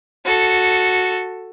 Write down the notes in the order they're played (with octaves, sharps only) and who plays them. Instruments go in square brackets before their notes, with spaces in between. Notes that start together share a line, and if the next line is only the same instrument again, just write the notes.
[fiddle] F#4 A4